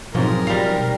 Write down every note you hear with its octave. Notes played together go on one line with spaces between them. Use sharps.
G#2 B2 F3 F#3 C4 A#4
G3 F5